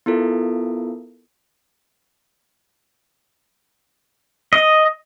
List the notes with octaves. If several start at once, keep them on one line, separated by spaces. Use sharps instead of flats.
B3 E4 F4 A4 A#4
D#5